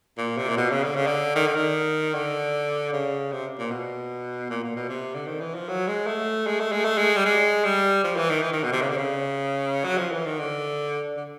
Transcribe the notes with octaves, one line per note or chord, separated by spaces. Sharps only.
A#2
C3
A#2
B2
C#3
D3
C#3
D3
D#3
D3
D#3
D3
C#3
C3
A#2
B2
A#2
A#2
B2
C3
D3
D#3
E3
F3
F#3
G#3
A3
G#3
A3
G#3
A3
G#3
G3
G#3
G3
F3
E3
D#3
E3
D#3
B2
C3
C#3
D3
C#3
F#3
F3
E3
D#3
D3
D3